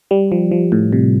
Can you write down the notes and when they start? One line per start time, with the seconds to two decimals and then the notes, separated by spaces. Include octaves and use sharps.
0.11 G3
0.32 F3
0.51 F3
0.72 A2
0.93 C3